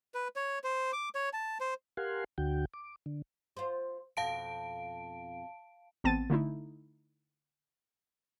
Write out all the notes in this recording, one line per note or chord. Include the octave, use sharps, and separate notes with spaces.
B4
C#5
C5
D6
C#5
A5
C5
G4 A#4 F5 F#5 G#5 C6
D2 D3 F#4 G5
D6
D3
F4 C5
F2 B2 F5 A5 D7
A1 B3 C4 A5 A6 D#7
D3 A3 D#4 E4